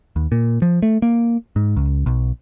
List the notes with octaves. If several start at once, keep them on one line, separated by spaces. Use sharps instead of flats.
D#2
A#2
F3
A3
A#3
G#2
C#2
B1